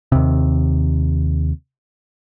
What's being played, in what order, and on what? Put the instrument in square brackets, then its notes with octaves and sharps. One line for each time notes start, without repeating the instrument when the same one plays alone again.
[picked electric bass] D#2 C3